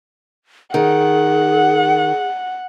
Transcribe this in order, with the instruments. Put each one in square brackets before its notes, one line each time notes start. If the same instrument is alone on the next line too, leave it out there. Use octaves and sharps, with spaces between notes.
[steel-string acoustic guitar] D#3 [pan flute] G#4 [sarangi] F#5